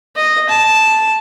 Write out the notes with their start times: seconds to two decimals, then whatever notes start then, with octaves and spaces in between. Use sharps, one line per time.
0.16 D#5
0.49 A5